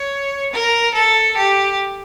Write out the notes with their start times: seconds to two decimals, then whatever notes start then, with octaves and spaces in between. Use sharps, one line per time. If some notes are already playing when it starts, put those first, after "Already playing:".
Already playing: C#5
0.53 A#4
0.94 A4
1.37 G4